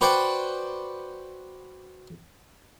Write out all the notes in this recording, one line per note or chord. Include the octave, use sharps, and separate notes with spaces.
F#4 B4 C5 D5 F#5 G5